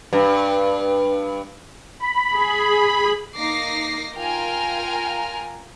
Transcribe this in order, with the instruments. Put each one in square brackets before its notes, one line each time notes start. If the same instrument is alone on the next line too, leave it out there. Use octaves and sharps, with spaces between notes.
[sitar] G2
[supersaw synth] B5
[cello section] G#4
[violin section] A#3 D#4 D6 A#6 C7
F4 A#4 G5 G#5 A#5 F6